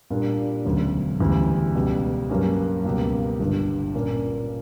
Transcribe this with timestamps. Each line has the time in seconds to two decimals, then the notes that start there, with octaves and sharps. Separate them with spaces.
0.10 A#2 G3 A#3 D4
0.65 E1 D2 C#3 F#3
1.20 D2 C#3 E3 G3
1.75 C#2 B2 G3
2.30 G2 F#3 A#3 C#4
2.85 C#2 B2 G3 A#3
3.40 G1 G2 D3
3.94 A#2 A#3 C#4